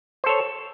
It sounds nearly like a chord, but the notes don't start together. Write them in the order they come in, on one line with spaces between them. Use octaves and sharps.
C5 A4 C#5